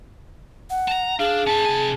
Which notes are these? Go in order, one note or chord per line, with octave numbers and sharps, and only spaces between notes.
F#5
A5 A#5
D4 G#4 F5
C#4 E5 A5
C3 G#5